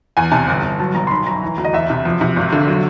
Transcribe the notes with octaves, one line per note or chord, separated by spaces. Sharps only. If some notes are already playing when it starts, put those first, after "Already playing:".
E2 G#5
C3 A5
G1
G1
F#3 A5
B1 A#5
C6
D#3 B5
F#2 A#5
E3
D2
D#5
E2 E5
C3
F3
C3
G#1
D3
F#3